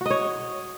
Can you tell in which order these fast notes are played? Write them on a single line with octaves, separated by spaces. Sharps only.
F#4 D#5 C#5